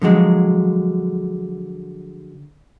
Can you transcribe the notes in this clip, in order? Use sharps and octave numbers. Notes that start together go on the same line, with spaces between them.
D3 F3 F#3 G#3